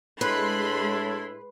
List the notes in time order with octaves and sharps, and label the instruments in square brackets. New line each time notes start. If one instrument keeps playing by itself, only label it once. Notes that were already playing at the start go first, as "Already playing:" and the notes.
[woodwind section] A2 D4 E4 [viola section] G#3 B5 C6 [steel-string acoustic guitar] B4